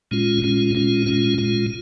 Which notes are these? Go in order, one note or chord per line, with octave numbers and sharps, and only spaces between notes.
A#2 G#3 C#4 F4
A#2 G#3 C#4 F4
A#2 G#3 C#4 F4
A#2 G#3 C#4 F4
A#2 G#3 F4